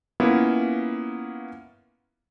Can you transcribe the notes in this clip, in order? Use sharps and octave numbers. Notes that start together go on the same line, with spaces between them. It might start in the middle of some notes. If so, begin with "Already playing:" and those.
A#3 B3 C#4 E4 F4